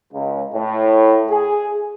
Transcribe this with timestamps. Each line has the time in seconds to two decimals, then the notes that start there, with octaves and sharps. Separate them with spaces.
0.13 C#2
0.54 A2
1.29 G#4